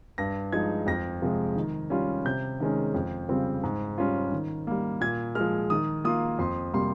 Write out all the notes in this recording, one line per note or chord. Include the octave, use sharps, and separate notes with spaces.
G2 A#6
F3 G#3 D#4 G#6
F2 A#6
C3 F3 G#3
D#3
G3 C#4 F4
C3 G6
D#3 G#3 C#4
F2
C#3 G3 C4 F4
G#2
G3 C#4 F4
D#3
G3 A#3
A#2 G#6
G#3 F6
F3
D#3 D#6
A#3 F4 D#6
F2 C6
C3 G3 A#3 C6